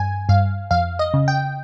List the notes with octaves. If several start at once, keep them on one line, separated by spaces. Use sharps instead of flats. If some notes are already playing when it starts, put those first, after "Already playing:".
Already playing: G2 G#5
G2 F5
F2 F5
D#5
C#3
G5